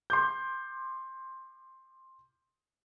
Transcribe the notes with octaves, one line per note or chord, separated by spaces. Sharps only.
C6 D6 G6